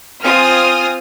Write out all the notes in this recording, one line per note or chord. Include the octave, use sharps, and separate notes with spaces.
C4 F4 G#5 D#6 F6